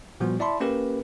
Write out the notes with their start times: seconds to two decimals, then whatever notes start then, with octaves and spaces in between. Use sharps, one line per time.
0.20 A#2 F3 G3 B3 F#4
0.39 E4 D5 E5 A5 B5 C6
0.60 A#3 C#4 G4 A#4 B4